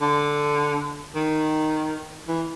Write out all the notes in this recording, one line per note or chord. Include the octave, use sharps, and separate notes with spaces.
D3
D#3
E3